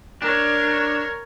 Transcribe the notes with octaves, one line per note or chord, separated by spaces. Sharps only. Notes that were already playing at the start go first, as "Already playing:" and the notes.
D4 A#4 C#5